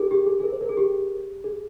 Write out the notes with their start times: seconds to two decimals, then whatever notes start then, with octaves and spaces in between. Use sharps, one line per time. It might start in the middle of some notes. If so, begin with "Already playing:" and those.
Already playing: G4 G#4 A#4
0.11 G4
0.26 G#4
0.40 G#4
0.44 A#4
0.52 C5
0.61 A#4
0.69 G#4
0.77 G4
1.44 G#4